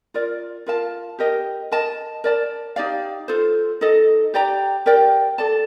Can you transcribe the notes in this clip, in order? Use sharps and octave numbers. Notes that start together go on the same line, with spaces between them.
F4 A#4 D5
F4 A#4 F5 A5
G4 A#4 D#5
A#4 D#5 A5
A#4 D5 A5
D#4 G4 D5 F5
F4 A4 C5
D#4 A4 D#5
G4 D5 G5 A#5
G4 A#4 D5 G5
A4 D5 A5